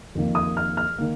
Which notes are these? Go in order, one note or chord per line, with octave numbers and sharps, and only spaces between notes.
F2 D#3 A#3
D#6
F6
F6
D#3 A#3